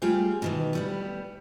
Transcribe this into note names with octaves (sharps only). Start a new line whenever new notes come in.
G3 A3 F4 G4 G#4 G5
B2 D#3 E3
A2 G3 B3